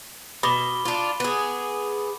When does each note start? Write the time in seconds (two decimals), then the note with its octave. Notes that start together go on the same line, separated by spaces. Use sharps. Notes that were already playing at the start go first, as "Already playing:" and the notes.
0.43 B2 B5 D6 G7
0.85 D4 F4
1.20 B3 G#4